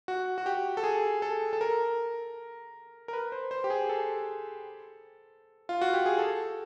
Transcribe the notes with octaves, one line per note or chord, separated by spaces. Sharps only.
F#4
F#4
G4
A4
G#4
A4
A4
A#4
A#4
B4
C5
C5
G4
G#4
A4
F4
F#4
G4
G#4
A4